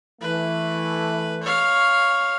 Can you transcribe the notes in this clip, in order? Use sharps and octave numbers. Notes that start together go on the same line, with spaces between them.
E3 A3 B4
C#5 F5